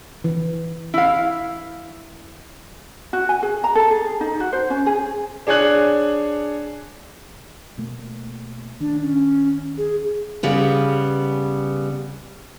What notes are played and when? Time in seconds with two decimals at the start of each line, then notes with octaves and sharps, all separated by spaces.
0.24 E3
0.94 E4 F5
3.13 F#4
3.29 G#5
3.43 G#4
3.64 A#5
3.75 A4
3.91 G#4
4.04 G#4
4.21 D#4
4.40 F#4
4.53 C5
4.70 C#4
4.86 G#4
5.47 D4 G#4 C#5 G#5 F#6 F#7
7.78 B2 A3 A#3
8.80 D#3 D4
9.03 C#4
9.78 G#4
10.43 C#3 G3 B3